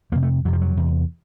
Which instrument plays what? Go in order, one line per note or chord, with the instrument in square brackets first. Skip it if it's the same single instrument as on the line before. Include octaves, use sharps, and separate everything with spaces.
[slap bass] F2 A#3
C3
A3
F2 F#3
C3
F3
F#3
E2 C3